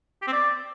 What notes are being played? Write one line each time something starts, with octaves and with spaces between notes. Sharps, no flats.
G4
C4
D5